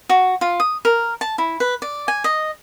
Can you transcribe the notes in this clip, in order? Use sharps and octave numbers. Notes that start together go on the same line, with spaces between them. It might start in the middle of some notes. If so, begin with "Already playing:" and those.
F#4
F4
D#6
A#4
A5
E4
B4
D5
G#5
D#5